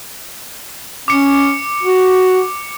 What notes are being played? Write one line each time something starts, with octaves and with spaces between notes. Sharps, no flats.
C#4 D6 C#7
F#4